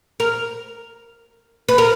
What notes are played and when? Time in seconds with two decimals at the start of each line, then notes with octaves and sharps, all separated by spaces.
0.20 A#4
1.68 B4
1.78 A#4